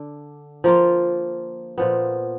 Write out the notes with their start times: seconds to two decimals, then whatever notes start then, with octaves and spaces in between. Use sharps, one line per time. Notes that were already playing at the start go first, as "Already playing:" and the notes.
Already playing: D3 D4
0.64 F3 A#3 F4
1.78 A#2 F3 B3